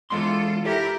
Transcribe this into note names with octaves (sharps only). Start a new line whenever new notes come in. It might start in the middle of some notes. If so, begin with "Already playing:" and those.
E2 G#3 F4 A4 C6
E4 G4 A4 A#4